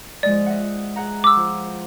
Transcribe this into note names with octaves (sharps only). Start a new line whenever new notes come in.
F3 G#3 D5 D#5
D#5 E5 F#5
G#4 F#5 A#5
D6 E6
F3